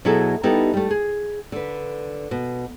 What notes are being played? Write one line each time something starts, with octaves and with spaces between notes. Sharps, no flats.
B2 F#3 E4 G#4 A4 E5
G3 B3 D#4 E4 G4 A4
G3 A3
G#4
D3 B4
B2